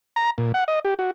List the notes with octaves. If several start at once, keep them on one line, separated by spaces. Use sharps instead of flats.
A#5
A#2
F#5
D#5
G4
F#4